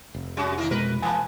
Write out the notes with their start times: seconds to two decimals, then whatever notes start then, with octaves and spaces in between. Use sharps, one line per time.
0.14 F1
0.37 G3 C#4 F#4
0.58 D#3 A#3 E4 F4
0.71 B2 G#3 A#4 B4
1.02 E3 A#3 G#5 A5